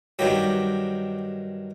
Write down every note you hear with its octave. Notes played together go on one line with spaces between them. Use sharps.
G2 D#3 F#3 G4